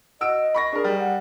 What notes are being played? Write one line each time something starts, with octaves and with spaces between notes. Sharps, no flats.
F#4 D#5 E6 D7
B5 C#6 A#6
D4 G#4 A#4
G3
F#5